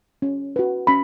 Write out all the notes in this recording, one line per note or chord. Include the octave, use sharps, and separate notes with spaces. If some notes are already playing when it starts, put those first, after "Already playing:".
C#4
F#4 B4
C#4 B5